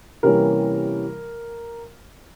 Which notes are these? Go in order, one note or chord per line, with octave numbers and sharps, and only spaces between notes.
C3 E3 G3 A#3 C#4 A#4